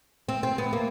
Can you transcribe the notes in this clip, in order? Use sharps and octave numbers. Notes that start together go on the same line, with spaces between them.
C4
C4
B3
A#3